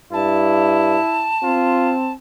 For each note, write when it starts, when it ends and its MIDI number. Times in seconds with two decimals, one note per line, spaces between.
0.13 0.96 43
0.13 1.32 64
0.13 2.12 81
1.44 2.14 60
1.44 1.95 65